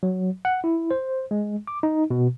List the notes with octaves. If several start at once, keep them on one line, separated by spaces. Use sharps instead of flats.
F#3
F#5
E4
C5
G#3
D6
D#4
B2